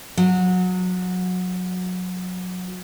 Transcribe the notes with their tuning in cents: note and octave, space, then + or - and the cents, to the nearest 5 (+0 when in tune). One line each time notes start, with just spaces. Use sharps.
F#3 -25